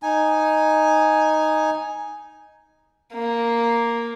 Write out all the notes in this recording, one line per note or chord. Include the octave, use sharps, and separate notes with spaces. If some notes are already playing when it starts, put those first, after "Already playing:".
D#4 G#5
A#3